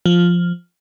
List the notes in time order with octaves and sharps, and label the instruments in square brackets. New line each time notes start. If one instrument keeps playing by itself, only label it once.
[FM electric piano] F3